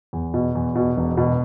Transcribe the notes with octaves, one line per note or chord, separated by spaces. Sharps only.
E2
B2
E2
B2
E1
B2